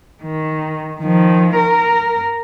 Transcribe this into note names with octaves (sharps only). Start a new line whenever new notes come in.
D#3
D#3 F3
A#4